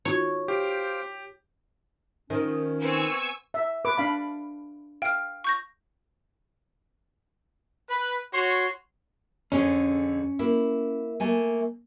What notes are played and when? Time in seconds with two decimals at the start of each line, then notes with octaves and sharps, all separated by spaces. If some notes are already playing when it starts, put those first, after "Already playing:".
0.05 D#4 F4 F#4 C#5
0.48 G4 C5 F5 G5
2.30 D#3 F3 C#4
2.79 B3 C4 G#5 C#6 E6
3.54 E5
3.85 B4 D6
3.98 D4 F5 B5
5.02 F5 G5 F6
5.44 C#6 G6 A#6
7.89 B4
8.33 F#4 C#5 C6
9.52 F2 D3 C#4 G#4
10.39 A#3 E4
11.20 A3 A#3 G#5